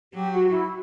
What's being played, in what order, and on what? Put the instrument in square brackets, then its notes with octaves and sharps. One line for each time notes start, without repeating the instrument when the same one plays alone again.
[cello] F#3 [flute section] G4
[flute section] F#4
E4